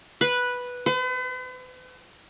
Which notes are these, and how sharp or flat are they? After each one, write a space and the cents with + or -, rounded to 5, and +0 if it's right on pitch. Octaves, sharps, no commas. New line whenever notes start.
B4 -5
B4 +45